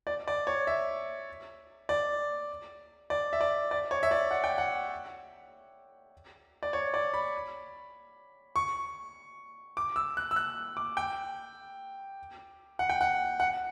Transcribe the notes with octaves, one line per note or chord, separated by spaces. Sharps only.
D5
D5
C#5
E5
D5
D5
E5
D5
D5
C#5
E5
D5
F#5
G5
F#5
D5
C#5
D5
B5
C#6
D6
E6
F#6
E6
F#6
D6
G5
F#5
G5
F#5
F#5